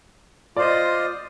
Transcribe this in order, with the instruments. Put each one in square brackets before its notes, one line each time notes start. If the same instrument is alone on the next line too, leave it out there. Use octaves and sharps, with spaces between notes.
[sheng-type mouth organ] F4 C5 D#5 [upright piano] D5